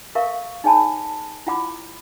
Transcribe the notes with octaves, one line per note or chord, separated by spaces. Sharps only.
A4 A#4 E5 F5 C#6
D#4 G#4 C#5 G#5 A5 B5
E4 F4 F#5 B5 D6